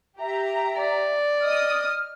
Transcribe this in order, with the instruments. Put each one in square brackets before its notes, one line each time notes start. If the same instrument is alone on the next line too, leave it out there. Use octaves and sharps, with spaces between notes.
[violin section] G4 A#5 [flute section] E5
[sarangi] D5
[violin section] D#5 D#6 [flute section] F6